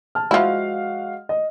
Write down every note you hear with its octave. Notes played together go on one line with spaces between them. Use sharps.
A5 F6
F3 G#3 E4 F#4 F5
D#5